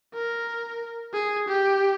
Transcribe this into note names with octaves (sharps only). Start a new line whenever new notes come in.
A#4
G#4
G4